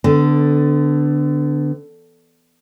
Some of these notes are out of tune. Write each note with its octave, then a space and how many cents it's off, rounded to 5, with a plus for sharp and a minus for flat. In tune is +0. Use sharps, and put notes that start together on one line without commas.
D3 +0 B3 +30